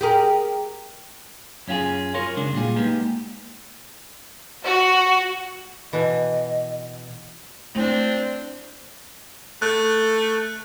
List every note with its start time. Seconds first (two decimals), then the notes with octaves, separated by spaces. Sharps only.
0.01 G4 G#4 A#4
1.68 F#2 C#4 F4 F#4 G#4
2.14 F4 F#4 A#4 C#5
2.36 C#3 G#3 D4
2.53 A#2 G3 F4 G#4
2.76 G#3 A#3 B3 D#4 G4
4.65 F#4
5.93 B2 E3 D#5
7.75 A3 C4 D4 E4
9.62 A3 F#6